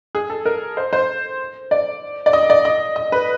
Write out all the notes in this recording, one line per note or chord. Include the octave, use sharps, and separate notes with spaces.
G#4
A4
A#4
C5
C5
D5
D5
D#5
D5
D#5
D#5
B4